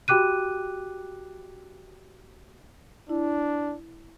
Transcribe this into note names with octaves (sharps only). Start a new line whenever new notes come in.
F#4 G4 G5 D6 F#6 D#7
D4 E4